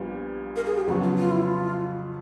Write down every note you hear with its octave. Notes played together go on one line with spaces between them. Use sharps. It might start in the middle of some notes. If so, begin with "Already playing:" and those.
Already playing: A#1 A#2 G3 B3
A#4
G#4
G4
F2 C#3 F#3 B3 F#4
F4
F4
E4
F4